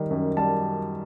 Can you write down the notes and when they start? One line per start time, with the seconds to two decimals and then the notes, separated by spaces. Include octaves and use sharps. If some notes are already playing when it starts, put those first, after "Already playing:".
Already playing: D#3 G3
0.11 F#2
0.37 G3 A5